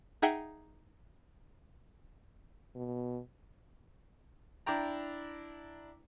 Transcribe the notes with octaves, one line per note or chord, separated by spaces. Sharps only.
D#4 G#4 E5 F#5 G5
B2
D4 E4 G5 A#5